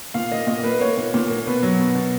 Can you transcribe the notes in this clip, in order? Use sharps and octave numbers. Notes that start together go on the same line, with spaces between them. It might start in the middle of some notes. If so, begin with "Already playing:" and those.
A#2 F5
A#3 D#5
A#2 D#5
A#3 B4
A#3 C#5
A#2
A#2
A#3
B2 B4
F#3
B2
B2